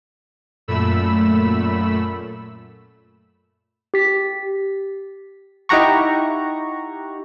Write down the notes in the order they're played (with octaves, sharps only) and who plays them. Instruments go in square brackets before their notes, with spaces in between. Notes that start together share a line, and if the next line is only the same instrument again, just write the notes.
[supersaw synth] F#2 A#2 A3 B5 E6
[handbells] G4 B6
[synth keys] D#4 E4 G4 F#5 A#5 C#6